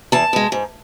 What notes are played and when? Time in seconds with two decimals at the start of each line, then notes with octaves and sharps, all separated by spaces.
0.12 E2 A5
0.33 B2 G#3
0.52 G#2